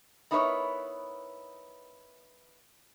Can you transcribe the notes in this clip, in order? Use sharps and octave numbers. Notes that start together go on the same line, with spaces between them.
B3 D#4 E4 A#4 B4 C#5